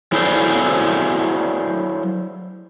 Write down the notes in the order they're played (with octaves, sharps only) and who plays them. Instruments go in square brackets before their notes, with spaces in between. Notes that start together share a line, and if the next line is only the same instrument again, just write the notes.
[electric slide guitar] F#3 E4 G#4 A4 C5 D5